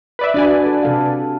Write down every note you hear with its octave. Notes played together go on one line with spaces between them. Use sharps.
B4 D5 E5
D4 F#4 B4 D5 G#5
A4
C3 A4 F5